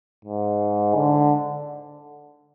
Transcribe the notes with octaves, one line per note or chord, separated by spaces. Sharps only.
G#2
D3